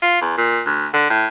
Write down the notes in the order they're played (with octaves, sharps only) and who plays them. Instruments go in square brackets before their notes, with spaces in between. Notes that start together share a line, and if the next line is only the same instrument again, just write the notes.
[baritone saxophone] F4
E2
A#2
D2
D3
A2